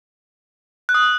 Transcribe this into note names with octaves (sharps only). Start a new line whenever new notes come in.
F#6
D#6